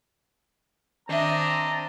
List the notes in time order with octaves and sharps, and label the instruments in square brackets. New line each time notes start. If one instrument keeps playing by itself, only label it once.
[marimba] D#3 E5 [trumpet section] C4 A5 A#5 [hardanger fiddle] D4 D#5